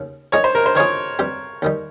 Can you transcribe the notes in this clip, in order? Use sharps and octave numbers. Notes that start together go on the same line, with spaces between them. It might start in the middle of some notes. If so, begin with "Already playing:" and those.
Already playing: D#2 C#3
A#2 G#3 D#4 G#4 C#5
C5
A#4
C5
D#3 A#3 F4 G#4 C#5
G2 G3 C4 G4
D#2 D#3 G3